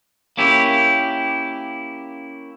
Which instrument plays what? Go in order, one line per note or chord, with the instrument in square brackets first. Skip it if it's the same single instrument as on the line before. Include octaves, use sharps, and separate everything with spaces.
[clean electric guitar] A#3 C#4 E4 G4